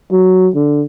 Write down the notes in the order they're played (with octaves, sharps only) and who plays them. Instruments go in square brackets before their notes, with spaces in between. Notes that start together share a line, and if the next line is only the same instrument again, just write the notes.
[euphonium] F#3
D3